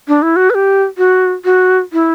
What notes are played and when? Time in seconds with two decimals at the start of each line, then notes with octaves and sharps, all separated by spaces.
0.08 D4
0.22 E4
0.36 F#4
0.50 B4
0.55 G4
0.98 F#4
1.45 F#4
1.93 E4